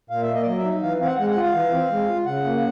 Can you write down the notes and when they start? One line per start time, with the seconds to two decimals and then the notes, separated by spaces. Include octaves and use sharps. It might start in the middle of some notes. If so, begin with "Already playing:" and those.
0.10 A#2 F5
0.22 E5
0.28 A#3
0.34 D#5
0.42 D5
0.46 F#3 D#5
0.58 E5
0.64 D#4
0.82 E3 F5
1.00 C4 F5
1.06 F#5
1.18 G#3 F#5
1.30 F#5
1.36 F4
1.42 F5
1.54 E3
1.72 C4
1.90 G#3
2.08 F4
2.26 C#3 F#5
2.44 A#3